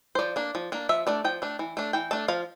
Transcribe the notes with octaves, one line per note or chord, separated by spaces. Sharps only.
C5
F3 D5
A#3 D4
F3
A#3 D4
F3 E5
A3 D4 D5
F3 G5
A3 D4
E3
A3 D4
E3 G5
A3 D4 A5
F3 F5